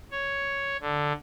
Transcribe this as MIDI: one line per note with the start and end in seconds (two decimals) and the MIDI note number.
0.11 0.77 73
0.81 1.13 50